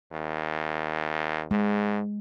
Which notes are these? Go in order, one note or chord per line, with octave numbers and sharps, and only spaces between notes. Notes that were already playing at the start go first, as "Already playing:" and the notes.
D#2
G#2 G#3